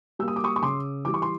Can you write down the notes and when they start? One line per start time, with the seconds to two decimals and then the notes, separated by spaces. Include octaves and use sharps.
0.19 G3 A#3 E6
0.28 D#6
0.36 D6
0.44 C#6 D#6
0.56 C#6
0.63 C#3 C6 D6
1.05 E3 G3 D6
1.14 C#6
1.22 C6